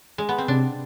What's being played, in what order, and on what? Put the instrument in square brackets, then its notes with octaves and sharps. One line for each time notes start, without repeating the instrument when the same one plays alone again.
[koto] G#3
B3
C4
[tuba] C3 [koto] D4